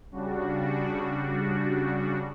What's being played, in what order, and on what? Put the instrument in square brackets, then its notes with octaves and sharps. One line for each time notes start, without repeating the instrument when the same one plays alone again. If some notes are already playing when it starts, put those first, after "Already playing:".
[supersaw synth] C#3 G3 D4 F#4